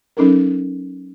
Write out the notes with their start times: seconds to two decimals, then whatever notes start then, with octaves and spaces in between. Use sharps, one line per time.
0.17 F#3 C#4 D#4 A4 A#4